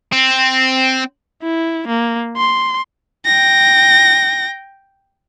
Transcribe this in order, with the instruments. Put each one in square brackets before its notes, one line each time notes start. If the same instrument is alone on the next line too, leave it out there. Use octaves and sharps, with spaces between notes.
[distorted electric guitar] C4
[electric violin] E4
A#3
C6
G5 A#6